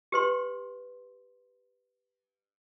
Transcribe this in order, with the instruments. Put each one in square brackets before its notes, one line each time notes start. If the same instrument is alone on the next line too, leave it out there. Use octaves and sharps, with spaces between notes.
[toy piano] G4 B4 C6